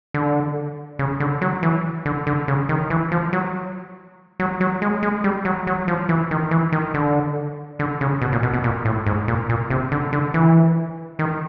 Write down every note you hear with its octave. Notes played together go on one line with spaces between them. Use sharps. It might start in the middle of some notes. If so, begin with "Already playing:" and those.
D3
C#3
D3
F#3
E3
D3
D3
C#3
D#3
E3
F3
F#3
F#3
F#3
G#3
G#3
G3
F#3
F#3
F3
E3
D#3
E3
D#3
D3
D3
C#3
B2
A#2
B2
B2
A#2
A2
G#2
A#2
A#2
C3
D3
D3
E3
D#3